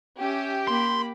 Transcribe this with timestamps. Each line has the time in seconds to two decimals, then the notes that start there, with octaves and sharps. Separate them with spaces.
0.19 C#4 G4 E5
0.68 A#3 B5 C6